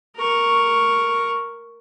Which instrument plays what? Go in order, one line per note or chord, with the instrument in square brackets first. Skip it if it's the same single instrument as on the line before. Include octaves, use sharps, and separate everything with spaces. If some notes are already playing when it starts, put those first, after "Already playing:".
[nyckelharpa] A#4 C#6